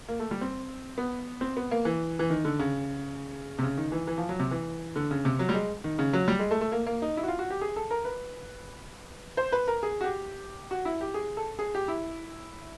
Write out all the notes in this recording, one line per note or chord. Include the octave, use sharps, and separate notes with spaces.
A#3
A3
G3
C4
B3
C4
B3
A#3
E3
E3
D#3
D3
C#3
C3
C#3
D#3
E3
E3
F3
F#3
C3
E3
D3
C#3
C3
F#3
G3
G#3
D#3
C#3
F#3
G3
G#3
A3
A3
A#3
A#3
D#4
E4
F#4
F4
F#4
G4
G#4
A4
A#4
B4
C5
B4
A#4
G#4
F#4
G4
F#4
E4
G4
G#4
A4
G#4
G4
E4